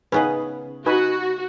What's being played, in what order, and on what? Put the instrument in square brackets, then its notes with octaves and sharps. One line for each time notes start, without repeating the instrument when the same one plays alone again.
[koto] C#3 B3 C#4 [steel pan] D#4 G#4 B4
[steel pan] D#4 B4 G#5 [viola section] F#4